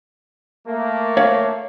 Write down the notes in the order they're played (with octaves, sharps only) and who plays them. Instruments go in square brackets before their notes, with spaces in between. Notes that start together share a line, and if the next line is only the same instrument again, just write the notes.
[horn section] A3 A#3
[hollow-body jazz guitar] C#5 F5